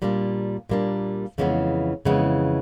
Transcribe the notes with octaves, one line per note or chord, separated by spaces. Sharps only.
A#2 G3 A#3 D4
A#2 G3 A#3 D4
F2 C#3 E3 G#3 B3
F2 C#3 E3 G#3 B3